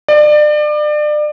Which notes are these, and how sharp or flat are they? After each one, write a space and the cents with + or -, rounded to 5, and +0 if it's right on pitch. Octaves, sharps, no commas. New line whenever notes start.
D5 +30